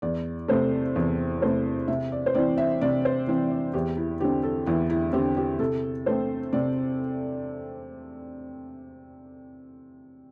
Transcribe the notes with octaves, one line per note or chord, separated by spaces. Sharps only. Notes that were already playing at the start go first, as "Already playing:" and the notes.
E2 D5
C3 A3 C5
E2
C3 A3 C5
C3 E5
D5
C5
E3 C4 D5
E5
C3 D5
C5
E3 C4
D5
E2 G4
E4
D3 C4 G4
A4
E2 E4
E4
D3 C4 G4
G4
C3 A4
A3 C4 C5
C3 D5